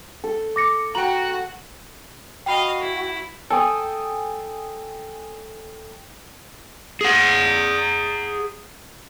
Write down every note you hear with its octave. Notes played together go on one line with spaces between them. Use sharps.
A4
D6 A#6 C#7
F#4 F#5 G5 A#5 F#7
F#4 D#5 F5 G5 B5
E4
A4 G5 G#5 D#6
G#4 F#5